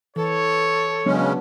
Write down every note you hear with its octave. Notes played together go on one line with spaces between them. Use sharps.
E3 A4 C#5
C#3 F#3 G#3 B3 C#4 D4